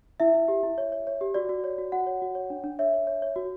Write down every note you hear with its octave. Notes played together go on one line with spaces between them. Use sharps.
E4 E5
E4
G4
E4
C#5
C#5
C#5
G4
F#4 D5
F#4
C#5
F#4
F#4 F#5
C#5
F#4
C#5
D4
D4
C#5 E5
C#5
C#5
C#5
F#4